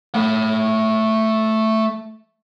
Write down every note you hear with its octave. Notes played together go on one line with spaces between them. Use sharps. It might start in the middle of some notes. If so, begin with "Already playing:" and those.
A3 B5